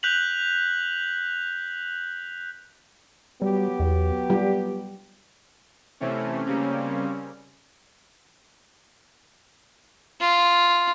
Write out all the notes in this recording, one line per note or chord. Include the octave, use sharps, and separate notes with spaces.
F#6 G6 B6 F7 F#7
F#3 G3 B3 G4
E2
G3 F4
C3 E3 A3 C4 C#4
C#3 G3 A#3 C4 C#4
F4